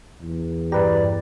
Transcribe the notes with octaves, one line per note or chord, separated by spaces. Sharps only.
E2
G2 G4 B4 D5 A#5